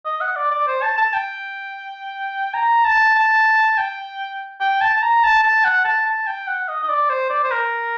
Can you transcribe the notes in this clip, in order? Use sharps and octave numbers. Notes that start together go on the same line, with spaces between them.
D#5
F#5
D5
D5
C5
A5
A5
G5
A#5
A5
A5
G5
G5
A5
A5
A#5
A5
A5
F#5
A5
A5
G5
F#5
D#5
D#5
D5
C5
D5
C5
A#4